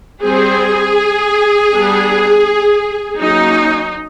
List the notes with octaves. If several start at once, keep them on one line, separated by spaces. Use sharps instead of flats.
G3 C4 G#4
G3 B3 D4
F#3 A#3 C#4 D#4